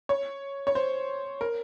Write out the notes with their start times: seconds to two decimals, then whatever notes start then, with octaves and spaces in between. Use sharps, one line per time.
0.09 C#5
0.67 C#5
0.75 C5
1.41 A#4